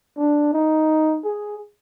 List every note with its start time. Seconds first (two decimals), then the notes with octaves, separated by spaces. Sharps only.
0.18 D4
0.53 D#4
1.24 G#4